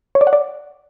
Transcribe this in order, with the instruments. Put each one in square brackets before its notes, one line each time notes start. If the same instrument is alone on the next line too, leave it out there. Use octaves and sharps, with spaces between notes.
[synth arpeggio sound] C#5
D5
F#5
D5